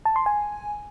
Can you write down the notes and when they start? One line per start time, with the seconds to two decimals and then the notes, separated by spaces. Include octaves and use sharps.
0.05 A5
0.16 C6
0.26 G#5